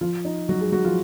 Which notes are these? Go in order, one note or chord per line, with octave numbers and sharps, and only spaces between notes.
F3 F4
D#4
F#3 F#4
G#3 G#4
F#3 F#4
F3 F4